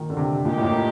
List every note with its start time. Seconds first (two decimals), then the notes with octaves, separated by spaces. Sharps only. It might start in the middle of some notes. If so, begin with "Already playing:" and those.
Already playing: A#2 D#3
0.10 D3
0.17 C3
0.45 A#2 D#3 A3 D#4 G4
0.58 A2
0.64 A#2